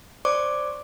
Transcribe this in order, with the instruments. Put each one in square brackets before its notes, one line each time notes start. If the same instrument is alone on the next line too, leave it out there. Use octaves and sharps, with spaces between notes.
[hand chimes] C5 D5 C#6 D6